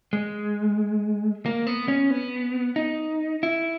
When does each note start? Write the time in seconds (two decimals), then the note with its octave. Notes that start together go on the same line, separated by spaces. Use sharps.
0.13 G#3
1.46 A#3
1.67 B3
1.88 C#4
2.11 B3
2.76 D#4
3.43 E4